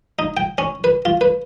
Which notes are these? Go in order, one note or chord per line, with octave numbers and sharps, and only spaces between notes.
D#4
G5
C#4
B4
F4
B4